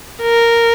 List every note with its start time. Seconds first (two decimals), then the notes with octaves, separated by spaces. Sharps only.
0.22 A#4